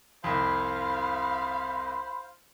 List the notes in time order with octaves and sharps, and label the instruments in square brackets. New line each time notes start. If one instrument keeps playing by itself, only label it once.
[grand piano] C2 F2 [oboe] C5 [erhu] F5 [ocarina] B5